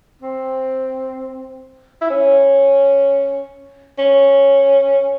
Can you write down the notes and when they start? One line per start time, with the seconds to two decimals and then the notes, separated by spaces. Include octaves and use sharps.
0.22 C4
2.01 E4
2.10 C#4
3.99 C#4